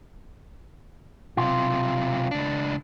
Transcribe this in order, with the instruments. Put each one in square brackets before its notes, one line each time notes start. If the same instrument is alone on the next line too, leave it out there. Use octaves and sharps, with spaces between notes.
[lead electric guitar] B1 C3 [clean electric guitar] F4
[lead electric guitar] C#2 D4